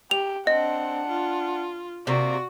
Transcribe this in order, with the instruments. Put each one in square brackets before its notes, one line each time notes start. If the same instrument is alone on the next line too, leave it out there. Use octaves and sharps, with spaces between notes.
[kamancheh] G4 [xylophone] F7
[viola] C4 [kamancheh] D4 F#5 [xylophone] D#5
[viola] F4
[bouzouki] C3 A#3 [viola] F#4 [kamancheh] D5